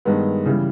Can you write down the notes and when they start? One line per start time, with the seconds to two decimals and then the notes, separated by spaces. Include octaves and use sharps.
0.05 G2 D#3 G#3 B3
0.45 C#3 E3 G3